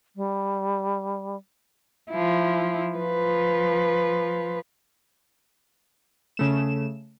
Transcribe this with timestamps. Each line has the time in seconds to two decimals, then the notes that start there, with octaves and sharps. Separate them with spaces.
0.16 G3
2.10 F3 E4
2.95 F3 B4
6.37 C#3 A3 E7